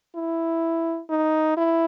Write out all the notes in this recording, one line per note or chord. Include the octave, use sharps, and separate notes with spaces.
E4
D#4
E4